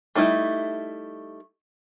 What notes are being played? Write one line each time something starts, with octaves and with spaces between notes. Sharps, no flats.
G3 A3 D#4 E4